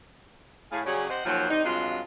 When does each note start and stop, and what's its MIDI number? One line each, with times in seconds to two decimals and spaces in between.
0.72 0.80 45
0.72 0.80 68
0.72 0.80 77
0.85 1.08 49
0.85 1.08 54
0.85 1.08 55
0.85 1.08 61
0.85 1.08 66
0.85 1.08 68
1.10 1.21 48
1.10 1.21 72
1.10 1.21 75
1.10 1.21 78
1.26 1.49 39
1.26 1.49 53
1.26 1.49 54
1.50 1.61 48
1.50 1.61 51
1.50 1.61 55
1.50 1.61 63
1.64 2.00 43
1.64 2.00 48
1.64 2.00 54
1.64 2.00 56
1.64 2.00 65